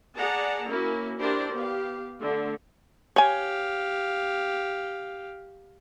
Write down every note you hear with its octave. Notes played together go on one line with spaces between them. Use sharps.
G#4 D5 F#5 A5 A#5
A#3 C#4 E4 F#4
D4 E4 G4 A#4 C5 D5
B3 G4 F5
D3 A3
G4 C#5 F5 G#5